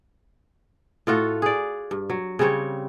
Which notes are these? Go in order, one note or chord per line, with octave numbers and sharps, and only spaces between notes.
A2 F4 F#4 A4
G#4 D5
G2
F#3
C#3 G3 C4 C#5